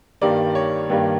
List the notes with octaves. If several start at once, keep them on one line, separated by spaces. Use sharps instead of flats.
G2 D#3 G3 A#3 D5
C#5
G2 D#3 G3 A#3